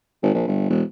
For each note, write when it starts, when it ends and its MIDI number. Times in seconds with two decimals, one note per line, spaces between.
0.23 0.31 32
0.34 0.46 34
0.47 0.65 31
0.69 0.82 28